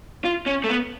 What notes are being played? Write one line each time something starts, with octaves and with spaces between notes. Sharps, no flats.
F4
C#4
A3
B3